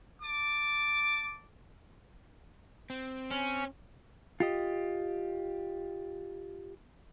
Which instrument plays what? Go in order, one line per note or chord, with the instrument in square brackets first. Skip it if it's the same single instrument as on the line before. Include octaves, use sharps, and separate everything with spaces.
[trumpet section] A5 D6
[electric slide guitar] C4
[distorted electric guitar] C#4
[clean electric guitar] F4 G4 D#5